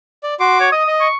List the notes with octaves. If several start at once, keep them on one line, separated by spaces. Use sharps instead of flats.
D5
F#4 C6 D6
C#5
D#5 D#6
D#5
C#6